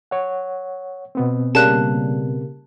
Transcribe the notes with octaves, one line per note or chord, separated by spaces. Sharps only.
C#5 F#5
B2 B3 C4
C#3 G3 A#3 A5 F#6